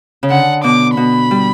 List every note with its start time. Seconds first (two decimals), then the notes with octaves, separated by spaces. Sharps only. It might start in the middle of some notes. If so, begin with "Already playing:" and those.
0.23 C#3
0.30 D3 F#5
0.64 B2 D6
0.97 B2 B5
1.31 G3